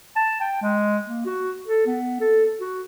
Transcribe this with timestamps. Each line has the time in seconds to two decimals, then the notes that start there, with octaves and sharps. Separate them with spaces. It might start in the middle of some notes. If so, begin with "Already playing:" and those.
0.16 A5
0.41 G5
0.62 G#3
1.06 A#3
1.26 F#4
1.67 A4
1.87 B3
2.21 A4
2.60 F#4